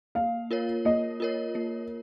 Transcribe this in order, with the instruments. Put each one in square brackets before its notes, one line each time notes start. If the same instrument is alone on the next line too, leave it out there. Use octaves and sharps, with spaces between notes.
[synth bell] A#3 [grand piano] F5
[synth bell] F4 A#4 C#5
[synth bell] A#3 [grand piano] D#5
[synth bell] F4 A#4 C#5
A#3